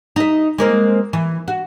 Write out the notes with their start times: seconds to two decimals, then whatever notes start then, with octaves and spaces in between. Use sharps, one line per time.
0.16 D#4 E5
0.58 G#3 A#3 C4
1.13 E3
1.48 F#4